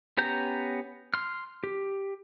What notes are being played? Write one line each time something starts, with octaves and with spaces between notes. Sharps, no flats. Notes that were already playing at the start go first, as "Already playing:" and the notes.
B3 C#4 G4 A#5 G6
C6 F6
G4